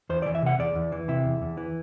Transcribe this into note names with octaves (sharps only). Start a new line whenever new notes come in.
E2 C5
D5
E3
E5
C3 F#5
E2 D5
E2
E3
C3 E4
E2
E2
E3